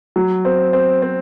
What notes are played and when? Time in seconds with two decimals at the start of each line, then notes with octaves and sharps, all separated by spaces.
0.16 F#3
0.45 C4
0.73 C4
1.02 C4